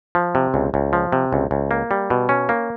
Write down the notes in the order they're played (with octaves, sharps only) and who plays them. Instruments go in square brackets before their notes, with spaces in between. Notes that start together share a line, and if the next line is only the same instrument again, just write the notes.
[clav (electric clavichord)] F3
C3
C#2
C#2
F3
C3
C#2
C#2
A#3
G3
B2
C#4
A#3